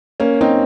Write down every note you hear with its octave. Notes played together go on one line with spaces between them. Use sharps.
A#3 C#4
C4 D#4